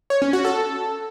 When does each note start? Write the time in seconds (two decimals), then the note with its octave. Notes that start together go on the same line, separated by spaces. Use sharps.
0.10 C#5
0.22 C#4
0.33 F#4
0.45 A4